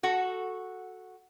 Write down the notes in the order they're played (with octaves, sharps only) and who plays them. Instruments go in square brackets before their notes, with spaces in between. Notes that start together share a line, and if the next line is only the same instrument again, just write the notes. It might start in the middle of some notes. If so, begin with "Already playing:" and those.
[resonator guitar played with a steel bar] F#4 A4